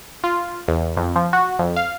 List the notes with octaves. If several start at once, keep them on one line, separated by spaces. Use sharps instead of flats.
F4
E2
F2
F3
F#4
F2
F5